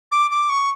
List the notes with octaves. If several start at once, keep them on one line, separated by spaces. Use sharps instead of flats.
D6
D6
C#6